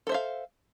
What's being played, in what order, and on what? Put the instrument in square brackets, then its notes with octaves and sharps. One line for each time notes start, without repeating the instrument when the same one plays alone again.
[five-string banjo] A4
C5
E5
F5